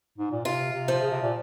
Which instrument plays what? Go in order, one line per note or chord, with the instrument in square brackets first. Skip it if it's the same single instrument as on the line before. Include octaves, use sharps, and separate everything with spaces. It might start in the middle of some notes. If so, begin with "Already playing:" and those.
[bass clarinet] G#2
A#2
[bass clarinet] C3 [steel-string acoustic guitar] F4
[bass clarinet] C3
[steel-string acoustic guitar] F3
[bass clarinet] C#3
C3
A#2